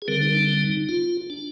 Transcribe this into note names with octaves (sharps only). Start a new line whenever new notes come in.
G#4
D3 G3 C4 A#4
D#4
D4
D#4
F4
D4